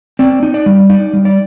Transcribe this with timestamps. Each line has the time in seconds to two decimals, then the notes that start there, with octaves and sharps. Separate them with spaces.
0.19 C4 D5
0.43 D#4
0.54 D5
0.66 G3
0.90 D#4 D5
1.13 G3
1.25 D5